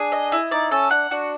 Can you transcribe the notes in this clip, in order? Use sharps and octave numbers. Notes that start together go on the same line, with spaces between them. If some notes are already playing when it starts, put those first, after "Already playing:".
Already playing: D4 G#4
D#5
E4
D#4 D5
C#4 A4
D4 F#5
D4 F#4